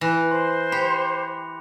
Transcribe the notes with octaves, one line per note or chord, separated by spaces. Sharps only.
E3 B5 F#6 A#6
C5 C6
G4 B5 C#7 F7